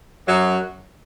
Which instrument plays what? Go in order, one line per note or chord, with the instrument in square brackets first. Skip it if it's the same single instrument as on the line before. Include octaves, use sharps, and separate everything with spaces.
[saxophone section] F#2 F#3